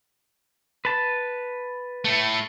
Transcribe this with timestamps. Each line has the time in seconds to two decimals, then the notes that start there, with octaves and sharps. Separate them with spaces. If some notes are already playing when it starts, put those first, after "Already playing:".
0.85 B4 A5
2.05 A2 A3